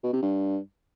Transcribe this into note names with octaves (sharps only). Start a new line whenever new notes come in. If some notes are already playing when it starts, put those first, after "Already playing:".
B2
C3
G2